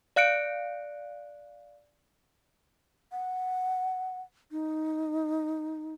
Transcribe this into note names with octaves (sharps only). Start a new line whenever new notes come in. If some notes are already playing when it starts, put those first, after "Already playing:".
D5 F5 F#6 C#7 D7
F#5
D#4